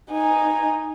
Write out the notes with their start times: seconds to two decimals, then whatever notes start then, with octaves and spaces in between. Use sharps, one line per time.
0.11 D#4 G#5